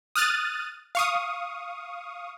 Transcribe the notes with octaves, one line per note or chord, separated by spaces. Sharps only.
D#6 F6 F#6 A6 D#7
F5 C#6 D#6